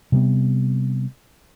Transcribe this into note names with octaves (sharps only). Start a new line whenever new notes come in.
C3 G3 A#3 B3